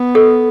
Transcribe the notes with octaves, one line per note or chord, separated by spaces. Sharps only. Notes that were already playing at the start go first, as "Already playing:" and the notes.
Already playing: B3
A4